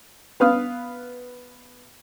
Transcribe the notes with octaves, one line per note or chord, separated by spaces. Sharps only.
B3 B4 F5 D#6 F6